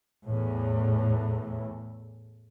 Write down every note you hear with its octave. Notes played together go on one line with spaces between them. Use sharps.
E2 A2